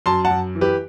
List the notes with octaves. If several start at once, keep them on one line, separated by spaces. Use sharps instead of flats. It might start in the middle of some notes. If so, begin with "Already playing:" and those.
F#2 A5 C6
F#5 A5
F#2
E3
G4 B4